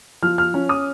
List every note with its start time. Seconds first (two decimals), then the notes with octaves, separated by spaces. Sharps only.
0.22 F3 F6
0.38 F6
0.54 C#4
0.69 D#6